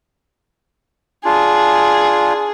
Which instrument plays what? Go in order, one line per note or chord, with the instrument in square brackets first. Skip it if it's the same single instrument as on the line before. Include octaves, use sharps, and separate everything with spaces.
[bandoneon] D4 F4 [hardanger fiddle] G#4